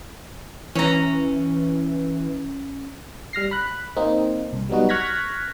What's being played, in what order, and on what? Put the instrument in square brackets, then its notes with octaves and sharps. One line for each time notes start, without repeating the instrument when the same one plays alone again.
[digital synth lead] E3 [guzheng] C#4 A#5
[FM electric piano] G3 F6 A#6 C7
B5 F#6
A#3 C4 D#4
C2
F#3 G3 B3 D#4 F#4
C#6 F6 F#6 G#6 A#6 B6